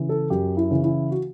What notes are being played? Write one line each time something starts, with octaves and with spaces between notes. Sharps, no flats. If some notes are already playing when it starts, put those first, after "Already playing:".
Already playing: C#3 E3
A4
F#2 G4
E4
C#3 E3
E4
F#4